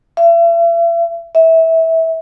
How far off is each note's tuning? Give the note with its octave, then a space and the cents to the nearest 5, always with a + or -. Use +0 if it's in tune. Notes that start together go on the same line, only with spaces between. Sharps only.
E5 +40
E5 -20